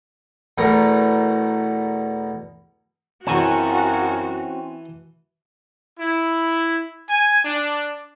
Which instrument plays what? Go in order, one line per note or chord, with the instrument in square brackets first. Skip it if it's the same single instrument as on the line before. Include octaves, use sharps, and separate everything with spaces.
[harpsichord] E2 B2 A3 A#4
[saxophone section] F#2 C#3 [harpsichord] E3 G#5 A5 [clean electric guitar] C4 C#4 [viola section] F#4
[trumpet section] E4
G#5
D4